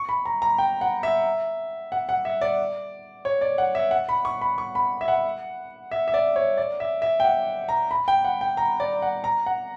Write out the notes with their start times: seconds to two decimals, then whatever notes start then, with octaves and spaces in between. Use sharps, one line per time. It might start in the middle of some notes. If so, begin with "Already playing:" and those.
Already playing: C#6
0.09 B5
0.26 A#5
0.42 A#5
0.58 G5
0.81 F#5
1.03 E5
1.92 F#5
2.09 F#5
2.25 E5
2.41 D5
3.25 C#5
3.41 D5
3.58 F#5
3.75 E5
3.91 F#5
4.09 B5
4.25 C#6
4.41 B5
4.58 C#6
4.75 B5
5.01 E5
5.08 F#5
5.91 E5
6.08 E5
6.14 D5
6.36 C#5
6.57 D5
6.80 E5
7.02 E5
7.20 G5
7.25 F#5
7.69 A#5
7.91 B5
8.08 G5
8.25 F#5
8.41 G5
8.57 A#5
8.80 D5
9.02 F#5
9.24 A#5
9.46 F#5